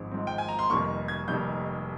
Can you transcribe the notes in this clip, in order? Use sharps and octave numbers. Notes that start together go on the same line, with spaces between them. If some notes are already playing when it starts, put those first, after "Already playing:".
Already playing: G#1 G#2 F3 C4
G#1 G#2 F3 C4
G5
G#5
A#5
C6
F1 F2 D#3 G3 A#3 C#6
G#6
F1 F2 D#3 G3 A#3 G6